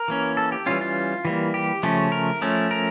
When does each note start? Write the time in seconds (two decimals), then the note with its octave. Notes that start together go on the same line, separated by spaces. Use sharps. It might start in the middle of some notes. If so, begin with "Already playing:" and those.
Already playing: A#4
0.08 E3 A#3 C#4
0.37 A4
0.52 G4
0.66 E3 G3 C#4 F4
0.81 F4
1.25 E3 G3 A#3
1.54 G4
1.83 C#3 F3 A3 C#4
2.12 A#4
2.42 F3 A3 C#4
2.71 A#4